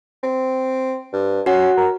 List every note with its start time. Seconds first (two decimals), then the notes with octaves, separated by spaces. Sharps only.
0.23 C4
1.13 G2
1.46 C#4 F#4 F#5
1.77 A#4